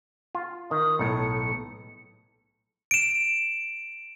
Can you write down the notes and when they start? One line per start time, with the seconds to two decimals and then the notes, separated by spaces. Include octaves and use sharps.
0.35 F4
0.71 D#3 D#6
0.99 B1 A2 C#7
2.91 D7 E7